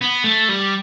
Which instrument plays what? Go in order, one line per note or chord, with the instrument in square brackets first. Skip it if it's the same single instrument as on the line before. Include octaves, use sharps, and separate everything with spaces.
[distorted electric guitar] B3
A3
G3